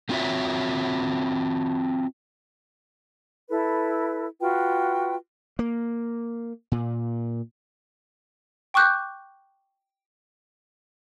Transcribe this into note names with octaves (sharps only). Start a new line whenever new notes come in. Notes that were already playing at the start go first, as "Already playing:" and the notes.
A3 C4 F4 F#4 C#5 E5
E4 A4 B4
F4 F#4 B4 G5
A#3
A#2
G5 C#6 D6 F#6 G6